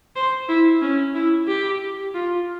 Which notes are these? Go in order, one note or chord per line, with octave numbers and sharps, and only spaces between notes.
C5
E4
C#4
E4
G4
F4